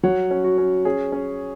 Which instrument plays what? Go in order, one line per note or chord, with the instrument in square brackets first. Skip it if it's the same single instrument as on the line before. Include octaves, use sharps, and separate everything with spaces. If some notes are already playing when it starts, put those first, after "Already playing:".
[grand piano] F#3 C#5 F#5
C#4
F#4
C#4
C#4 G#4
C#4